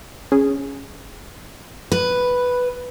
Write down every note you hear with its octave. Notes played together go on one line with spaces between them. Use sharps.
C#4 G#4
B4